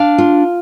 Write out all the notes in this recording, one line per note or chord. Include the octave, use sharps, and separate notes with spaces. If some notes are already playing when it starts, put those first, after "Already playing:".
Already playing: D4 F5
F4